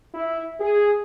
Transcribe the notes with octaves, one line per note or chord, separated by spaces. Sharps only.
E4
G#4